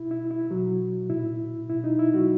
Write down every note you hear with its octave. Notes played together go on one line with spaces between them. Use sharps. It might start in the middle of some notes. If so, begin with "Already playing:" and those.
Already playing: B2 E4
E4
E4
B2 F#3 F#4
A#2 E4
B2 E4
D#4
E4
F#3 F#4